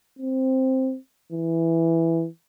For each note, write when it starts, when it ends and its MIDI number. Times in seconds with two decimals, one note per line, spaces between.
0.19 0.97 60
1.32 2.27 52